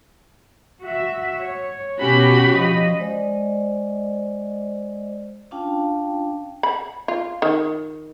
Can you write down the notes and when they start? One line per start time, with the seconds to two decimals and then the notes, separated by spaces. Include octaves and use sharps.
0.82 F#4 E5
1.40 C#5
1.98 B2 C#4 F#4 G4 B5
2.51 F3 D#5
2.99 G#3 C5 D5 D#5
5.51 C#4 D4 F4 F5 G5 A5
6.63 B5
7.08 F4
7.42 D#3